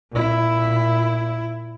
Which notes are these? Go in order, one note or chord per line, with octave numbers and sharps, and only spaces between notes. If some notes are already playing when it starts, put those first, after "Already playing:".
A#2 E4